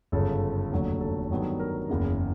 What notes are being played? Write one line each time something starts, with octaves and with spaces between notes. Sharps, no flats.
G1 F#2 C#3 A4
F1 D#2 D3 F#3
A4
G2 D#3 F#3 B3
A#4
F#1 E2 C#3